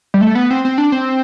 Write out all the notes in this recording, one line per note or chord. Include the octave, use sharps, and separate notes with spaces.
G3
A3
B3
C4
C4
D4
C4